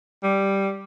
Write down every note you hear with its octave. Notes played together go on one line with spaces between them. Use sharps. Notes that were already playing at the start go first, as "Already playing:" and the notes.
G3